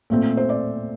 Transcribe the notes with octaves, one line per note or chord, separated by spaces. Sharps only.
A#2 A3 C4
C5
D5